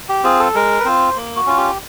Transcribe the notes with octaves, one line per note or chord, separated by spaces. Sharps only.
G4
C4 F4 G#4
A4
G#3 A#4
B4
C4 F4 C5
A#3
F#4
C#4 F4
G4